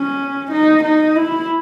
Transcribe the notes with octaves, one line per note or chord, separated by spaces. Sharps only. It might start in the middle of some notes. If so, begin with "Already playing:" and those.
Already playing: C#4
D#4
D#4
E4